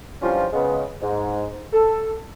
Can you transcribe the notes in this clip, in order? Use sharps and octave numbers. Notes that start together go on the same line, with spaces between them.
E3 F3 G3 C#4 D4 F4
C#3 G#3 B3
G#2
A4